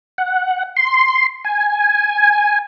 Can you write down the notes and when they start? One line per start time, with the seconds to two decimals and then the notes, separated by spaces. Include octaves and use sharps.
0.18 F#5
0.77 C6
1.45 G#5